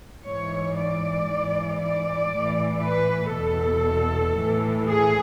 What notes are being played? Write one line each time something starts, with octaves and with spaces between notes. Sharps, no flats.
G#2 E3 C#5
D5
G#2 E3
D5
A2 E3
B4
E2 B2 A4
A2 E3
G#4